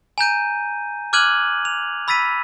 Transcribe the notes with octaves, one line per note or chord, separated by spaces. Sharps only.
G#5 A#5 G6 D#7
D6 F6 F#6 G#6 D#7 F#7
F7
B5 E6 A6 B6 D#7